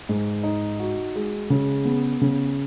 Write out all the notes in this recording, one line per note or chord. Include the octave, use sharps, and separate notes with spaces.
G#2
D#4
F#4
G#3
C#3
B3
C#3